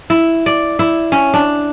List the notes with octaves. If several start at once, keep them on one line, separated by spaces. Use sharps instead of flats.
E4
D5
E4
C#4
D4